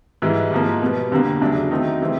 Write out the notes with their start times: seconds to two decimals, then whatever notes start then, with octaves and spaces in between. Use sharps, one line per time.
0.22 G#2 E3 G3
0.52 G#2 F3 A#3
0.82 B2 G3 B3
1.12 F2 D3 G3 A#3
1.41 E2 C#3 F#3 A3 D4
1.71 D#3 F#3 A3 C4 D#4
2.01 C#3 E3 G3 C4